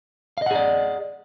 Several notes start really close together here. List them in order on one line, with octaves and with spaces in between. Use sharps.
F5 D#5 F#5 G#4 D5